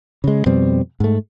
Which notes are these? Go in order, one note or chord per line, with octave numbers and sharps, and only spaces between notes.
C#3 G#3
F2 B2 G3 C4
G#2 A3